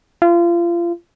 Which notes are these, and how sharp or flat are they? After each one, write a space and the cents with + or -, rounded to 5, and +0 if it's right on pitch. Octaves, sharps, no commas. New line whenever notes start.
F4 -30